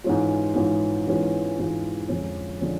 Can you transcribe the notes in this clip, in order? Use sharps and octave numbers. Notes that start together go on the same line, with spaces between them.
G#2 E3 G#3 C#4 F4
G#2 E3 G#3 C#4 F4
G#2 E3 G#3 C#4 F4
G#2 E3 G#3 C#4 F4
F2 D3 F3 G#3 C#4
D3 F3 G#3 C#4